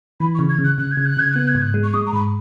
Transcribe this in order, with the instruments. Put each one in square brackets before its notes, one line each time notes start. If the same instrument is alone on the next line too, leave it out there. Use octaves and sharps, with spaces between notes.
[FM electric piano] E3 [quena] B5
[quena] C#6
[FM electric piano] C#3
[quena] G#6
[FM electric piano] C#3
[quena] F#6
[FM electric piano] C#3 [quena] F#6
[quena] G#6
[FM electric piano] C#3
[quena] F#6
[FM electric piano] C#3 [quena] G#6
[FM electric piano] B3 [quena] F#6
[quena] G#6
[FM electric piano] G#2
[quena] F#6
[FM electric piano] G#3
[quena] C#6
[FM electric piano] G#3 [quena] D#6
[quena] A#5
[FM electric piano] G#2 [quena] B5